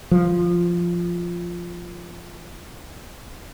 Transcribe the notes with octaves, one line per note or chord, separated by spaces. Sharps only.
F3